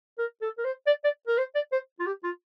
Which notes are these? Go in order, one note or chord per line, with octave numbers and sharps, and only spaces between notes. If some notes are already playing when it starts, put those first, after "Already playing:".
A#4
A4
A#4
C5
D5
D5
A#4
C5
D5
C5
F4
G4
F4